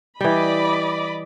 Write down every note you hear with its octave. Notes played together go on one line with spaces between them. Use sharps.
E3 G3 D5 D#5 B5